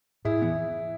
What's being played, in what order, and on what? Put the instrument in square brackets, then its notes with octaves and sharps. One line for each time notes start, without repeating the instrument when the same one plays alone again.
[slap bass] A2 [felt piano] E4 G#4
[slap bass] E3 B3